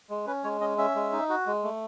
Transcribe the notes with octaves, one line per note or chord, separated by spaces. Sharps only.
G#3
C#4 B4
G#3 C#5
C#4 D#5
C#4 E5
G#3
D#4
F#4
G#3
A3